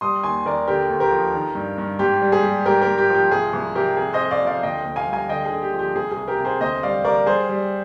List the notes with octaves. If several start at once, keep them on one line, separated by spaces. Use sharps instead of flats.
G3 C6 D#6
D#2 G#5 C6
D#2 A#4 D5
D3 G4 A#4
D2
G4 A#4
F3
D#3
G2
G2
G#2 G4
G3
G#4
G3
G#2 G4 A#4
G4 A#4
G#2
G4
F3
G4
C2 G#4
C2
C2 G4 A#4
F2 G#4
C5 D#5
F2
D5 F5
F3
D5 F5
D2 D#5 G5
D2
F5 G#5
G3
F5 G#5
D3 D#5 G5
G#4
D3
G4
F3
G4
C2 G#4
G#4
C2
G4 A#4
C3
G#4 C5
D2 C5 D#5
G3 D5 F5
G3 A#4 D5
G3 G#4 C5
G3